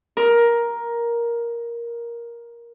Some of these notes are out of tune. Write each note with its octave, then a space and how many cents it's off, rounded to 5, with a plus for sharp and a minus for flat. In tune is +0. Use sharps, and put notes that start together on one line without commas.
A#4 +10